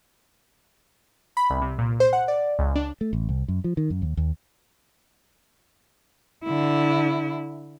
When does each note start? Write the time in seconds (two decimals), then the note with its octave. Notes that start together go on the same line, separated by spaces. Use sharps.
1.37 B5
1.50 C2
1.61 C3
1.78 A#2
2.00 C5
2.13 F#5
2.28 D5
2.59 C#2
2.76 D4
3.01 A3
3.13 A1
3.29 C2
3.48 F#2
3.64 F3
3.77 D#3
3.90 F#2
4.02 D#2
4.17 D#2
6.44 D3 E4